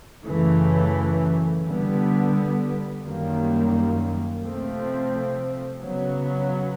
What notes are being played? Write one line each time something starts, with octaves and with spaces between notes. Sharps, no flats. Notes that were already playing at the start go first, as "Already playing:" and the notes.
F#2 C#3 E3 A3
D3 G3 B3
F#2 D#3 G3 A#3
C3 F3 A3 C4
C#3 F#3 B3